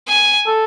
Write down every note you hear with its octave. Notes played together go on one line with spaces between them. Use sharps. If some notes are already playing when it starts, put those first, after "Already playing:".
G#5
A4